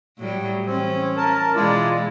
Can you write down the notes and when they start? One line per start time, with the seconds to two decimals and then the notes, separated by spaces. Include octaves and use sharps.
0.18 A2 F#3 G3
0.66 E3 C4 C#4
1.17 A#4 A5
1.55 B2 E3 G#3 E4 F4 D5